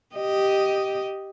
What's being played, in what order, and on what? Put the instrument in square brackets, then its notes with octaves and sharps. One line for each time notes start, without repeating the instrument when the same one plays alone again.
[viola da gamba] G4 D#5